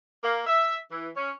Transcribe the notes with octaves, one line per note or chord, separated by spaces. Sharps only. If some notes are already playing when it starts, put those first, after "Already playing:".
A#3
E5
E3
C#4